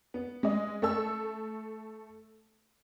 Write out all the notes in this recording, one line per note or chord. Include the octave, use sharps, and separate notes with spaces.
B3
G#3 D#5
A3 A4 E6